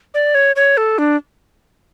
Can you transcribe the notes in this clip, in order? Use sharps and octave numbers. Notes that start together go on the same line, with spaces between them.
D5
C#5
C#5
A4
D4